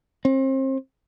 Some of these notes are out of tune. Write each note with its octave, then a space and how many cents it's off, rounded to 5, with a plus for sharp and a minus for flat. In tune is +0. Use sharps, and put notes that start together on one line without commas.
C4 +35